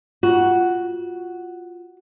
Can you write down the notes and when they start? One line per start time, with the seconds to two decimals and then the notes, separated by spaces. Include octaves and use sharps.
0.23 F4 F#4